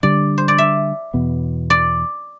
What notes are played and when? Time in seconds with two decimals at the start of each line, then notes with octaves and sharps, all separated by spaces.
0.03 D3 G3 D4 D5
0.38 C5
0.48 D5
0.58 E5
1.14 E2 B2 B3
1.70 D5